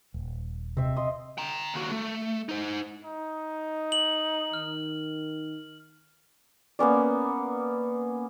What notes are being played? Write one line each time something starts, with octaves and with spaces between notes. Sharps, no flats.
D#1
C3 C4 E5
D#5 C6
G5 A#5
D#2 F#4
A3
D#4 C5
D#4
F#7
D#3 F6
A#3 B3 C#4 D5